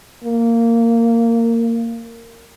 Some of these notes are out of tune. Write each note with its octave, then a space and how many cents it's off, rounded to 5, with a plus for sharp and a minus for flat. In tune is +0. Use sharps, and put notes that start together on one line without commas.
A#3 -15